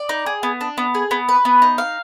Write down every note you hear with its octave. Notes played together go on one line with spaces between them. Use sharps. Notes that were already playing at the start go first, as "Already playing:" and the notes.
Already playing: D5
D#4
G#4
B3
D4
B3
G#4
B3
B4
B3
D#4
F5